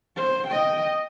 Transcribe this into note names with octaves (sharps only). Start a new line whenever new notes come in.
C5
D#5 G5